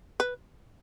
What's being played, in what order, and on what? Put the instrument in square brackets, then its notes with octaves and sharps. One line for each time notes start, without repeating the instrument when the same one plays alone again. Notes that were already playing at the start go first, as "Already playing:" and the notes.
[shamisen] B4